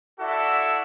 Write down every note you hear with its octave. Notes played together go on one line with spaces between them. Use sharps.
E4 F#4 A4 D5 E5 F#5